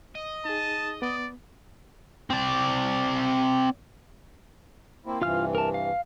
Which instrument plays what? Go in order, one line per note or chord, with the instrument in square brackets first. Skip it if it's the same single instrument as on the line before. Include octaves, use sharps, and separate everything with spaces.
[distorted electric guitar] D#5
[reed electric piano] D#4 G#4 [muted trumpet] A5
[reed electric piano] B3 [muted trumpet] D5
[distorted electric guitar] C4 D5
[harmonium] A#3 C4 E4
[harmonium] G2 C3 E3 [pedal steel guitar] F4 F5 F6
[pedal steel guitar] A#4 A5
F5